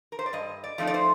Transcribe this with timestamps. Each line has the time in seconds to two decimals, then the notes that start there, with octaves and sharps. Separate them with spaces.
0.12 A#4
0.19 C5
0.26 D5
0.33 G2 D#5
0.64 D5
0.78 F3 A3 C4 D#4
0.87 D5
0.94 C5